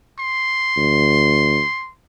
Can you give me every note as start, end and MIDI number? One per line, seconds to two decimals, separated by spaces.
0.19 1.91 84
0.77 1.61 38